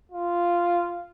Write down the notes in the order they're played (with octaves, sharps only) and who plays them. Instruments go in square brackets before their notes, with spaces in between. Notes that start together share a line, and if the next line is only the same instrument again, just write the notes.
[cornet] F4